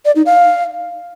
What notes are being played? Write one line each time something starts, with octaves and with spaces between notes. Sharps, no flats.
D5
D#4
F5